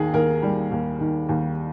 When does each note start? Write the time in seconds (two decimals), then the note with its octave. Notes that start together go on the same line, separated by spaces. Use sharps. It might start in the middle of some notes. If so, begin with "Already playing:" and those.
Already playing: D#2 D#3 G#4
0.13 D#2 A#4
0.42 G3
0.71 D#2
1.00 D#3
1.29 D#2